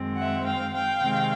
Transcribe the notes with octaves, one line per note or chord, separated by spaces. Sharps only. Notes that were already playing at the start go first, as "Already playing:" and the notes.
Already playing: F#2 D#3 G#3 C4
E5 F#5
F5 G5
F5 G5
C3 D#3 G#3 C4